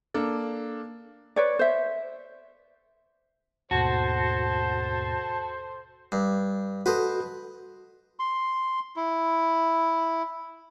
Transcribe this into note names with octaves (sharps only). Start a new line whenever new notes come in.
A#3 D4 A4
B4 C#5 D5
C5 E5
D#2 G#2 B2 F#4 A4 C5 A5
G2
F#4 A4 B4 C5 D#5
C6
E4